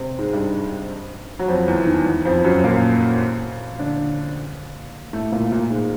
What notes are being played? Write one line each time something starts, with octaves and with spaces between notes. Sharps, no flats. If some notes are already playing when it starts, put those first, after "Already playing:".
Already playing: C3 C4
G#2 G#3
G2 G3
F#3
F2 F3
E2 E3
D#3
E2 E3
F2 F3
F#2 F#3
A#2 A#3
D3 D4
A2 A3
A#2 A#3
A#2 A#3
G#2 G#3